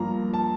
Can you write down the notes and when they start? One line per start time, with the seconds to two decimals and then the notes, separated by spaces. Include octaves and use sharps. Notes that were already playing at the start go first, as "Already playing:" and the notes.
Already playing: G2 F3 A#3 F4 A#5
0.34 A5